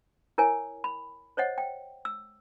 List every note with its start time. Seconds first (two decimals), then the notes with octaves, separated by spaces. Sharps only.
0.38 E4 A#4 C#5 G#5
0.84 B5
1.37 C5 C#5 D#5 F#5
1.58 G5
2.05 E6